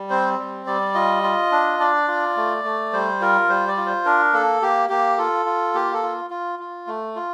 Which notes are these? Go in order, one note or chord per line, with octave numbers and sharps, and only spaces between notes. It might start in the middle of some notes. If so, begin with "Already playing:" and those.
Already playing: G3
C4 C5
G3
G3 D5
F4 D#5
F4
D4
D4 D5
F4
A3
A3
G3 C5
F4 A#4
G3 C5
D5
F4
C5
D4 A#4
A#3 A4
A#3 G4
A#3 G4
F4 A4
F4
A#3 G4
A4
F4
F4
F4
A3
F4